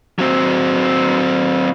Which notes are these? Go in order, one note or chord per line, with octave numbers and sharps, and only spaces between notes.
F#3 C4